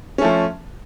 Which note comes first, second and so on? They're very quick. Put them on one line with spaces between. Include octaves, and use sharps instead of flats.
C#4 A3 F3